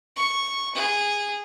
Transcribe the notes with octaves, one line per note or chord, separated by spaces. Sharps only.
C#6
G#4